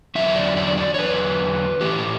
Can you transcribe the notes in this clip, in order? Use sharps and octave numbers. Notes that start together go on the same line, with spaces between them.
E2 D3 F#3 E5
D5
D5
D5
C#5
E2 D3 F#3 B4
A2 E3 G4